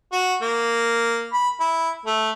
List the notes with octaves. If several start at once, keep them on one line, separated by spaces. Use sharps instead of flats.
F#4
A#3
B5
E4
A3